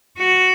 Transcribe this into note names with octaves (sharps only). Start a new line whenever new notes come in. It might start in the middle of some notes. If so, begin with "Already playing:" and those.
F#4